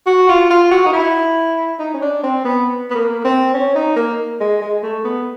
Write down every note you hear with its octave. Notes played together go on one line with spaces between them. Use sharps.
F#4
F4
F4
F#4
D#4
E4
D#4
C#4
D4
C4
B3
B3
A#3
C4
C#4
D#4
A#3
G#3
G#3
A3
B3